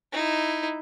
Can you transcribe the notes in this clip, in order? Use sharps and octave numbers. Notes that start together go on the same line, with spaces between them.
D#4 E4